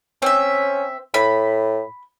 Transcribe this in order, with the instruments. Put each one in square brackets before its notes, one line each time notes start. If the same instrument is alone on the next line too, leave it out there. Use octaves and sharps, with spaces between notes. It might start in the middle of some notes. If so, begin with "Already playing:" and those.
[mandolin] C4 E5 [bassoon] C#4
[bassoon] A2 [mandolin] B5